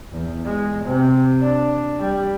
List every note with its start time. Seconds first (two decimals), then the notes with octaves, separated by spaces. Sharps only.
0.12 E2
0.45 G#3
0.86 C3
1.43 D4
2.00 G3